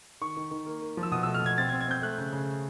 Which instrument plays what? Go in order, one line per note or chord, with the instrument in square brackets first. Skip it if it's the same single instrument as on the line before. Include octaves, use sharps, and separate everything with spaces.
[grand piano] D#3 C#6
D#3
D#3
A#3
A#3
F3
E6
B2 D#6
A3 E6
F6
B2 G#6
C4 A6
G#6
C4
G#6
C4 G6
A3 F#6
C#3
C#3